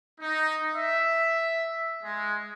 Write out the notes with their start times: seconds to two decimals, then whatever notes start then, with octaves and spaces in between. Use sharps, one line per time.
0.20 D#4
0.74 E5
2.02 G#3